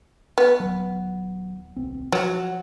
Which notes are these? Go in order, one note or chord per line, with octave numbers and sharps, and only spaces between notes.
B3
D#1 F#3
D1 B1 C4
F3 F#3